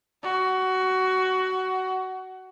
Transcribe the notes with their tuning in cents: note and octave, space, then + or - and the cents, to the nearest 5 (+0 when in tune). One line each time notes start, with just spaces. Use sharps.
F#4 +20